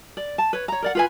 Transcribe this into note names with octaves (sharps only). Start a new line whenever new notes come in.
D5
A5
B4 C#5
C#5 A#5
A#4 D5 F#5
F4 B4 G#5